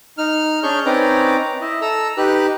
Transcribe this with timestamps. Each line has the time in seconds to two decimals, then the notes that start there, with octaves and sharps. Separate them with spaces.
0.18 D#4 F6
0.63 C#4 D4 G#4 C#6 F6 G6
0.86 C4 C#4 D#4 B4 D5 A#5
1.61 E4 D#5
1.81 A4 A#5 E6
2.17 D#4 G4 B4 F#6